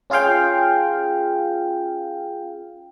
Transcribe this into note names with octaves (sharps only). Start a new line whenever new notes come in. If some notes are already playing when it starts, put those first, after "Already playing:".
C#4 F4 G#4 F5 G5